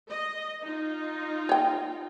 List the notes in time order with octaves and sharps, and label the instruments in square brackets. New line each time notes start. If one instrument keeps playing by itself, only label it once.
[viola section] D#5
D#4 F4
[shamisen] C#5 G5